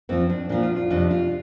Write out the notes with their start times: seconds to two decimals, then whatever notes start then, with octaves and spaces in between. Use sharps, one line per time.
0.09 F2 F3 C4
0.29 D4
0.49 A#2 F3 D4
0.63 F4
0.76 F4
0.90 F2 C3 F3 D4
1.11 F4